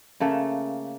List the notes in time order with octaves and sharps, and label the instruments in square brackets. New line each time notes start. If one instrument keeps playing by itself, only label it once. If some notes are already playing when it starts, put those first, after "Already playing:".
[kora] C#3 A3 A#3 A4